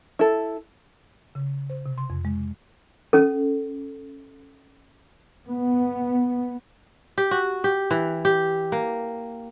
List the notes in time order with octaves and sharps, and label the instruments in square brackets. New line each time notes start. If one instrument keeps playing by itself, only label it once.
[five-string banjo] E4 A4
[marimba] C#3
C5
C3
C6
F2
G#3
[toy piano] C#4 A4
[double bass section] B3
[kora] G4
F#4
G4
E3
G4
A#3